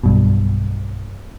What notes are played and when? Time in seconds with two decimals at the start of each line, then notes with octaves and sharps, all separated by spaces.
0.03 B1 G2 B2